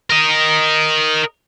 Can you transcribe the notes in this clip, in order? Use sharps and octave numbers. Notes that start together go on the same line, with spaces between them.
A#4 D#5